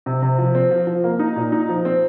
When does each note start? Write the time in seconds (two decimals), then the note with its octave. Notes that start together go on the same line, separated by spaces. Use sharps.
0.06 C3
0.22 C3
0.38 F3
0.55 C4
0.71 F3
0.87 F3
1.04 A#3
1.19 D#4
1.36 A#2
1.52 D#4
1.69 F3
1.85 C4